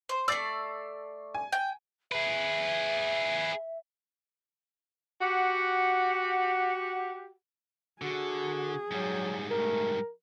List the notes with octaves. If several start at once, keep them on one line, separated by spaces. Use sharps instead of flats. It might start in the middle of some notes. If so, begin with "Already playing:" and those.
C5
A3 D5 E6 A6 C7
G#5
G5
G#4 B4 E5
F#4 G4 F#5
D3 F#4 G#4
G#2 F#3 G3
A3 A#4